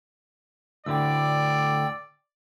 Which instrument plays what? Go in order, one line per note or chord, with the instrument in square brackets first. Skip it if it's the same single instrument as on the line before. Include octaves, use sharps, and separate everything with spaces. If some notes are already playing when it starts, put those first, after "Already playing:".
[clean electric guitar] D2 A2 D3 [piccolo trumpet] D5 [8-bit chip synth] G5 E6